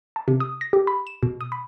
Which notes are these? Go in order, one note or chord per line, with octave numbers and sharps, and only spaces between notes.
A5
C3
D#6
A#6
G4
B5
E7
B2
D#6
B5